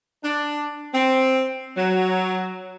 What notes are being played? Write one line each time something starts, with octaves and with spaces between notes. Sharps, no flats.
D4
C4
F#3